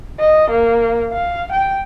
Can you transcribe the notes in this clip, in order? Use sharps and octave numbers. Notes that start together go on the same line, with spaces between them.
D#5
A#3
F5
G5